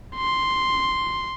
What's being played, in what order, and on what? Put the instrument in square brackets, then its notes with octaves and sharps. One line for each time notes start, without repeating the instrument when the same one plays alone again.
[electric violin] C6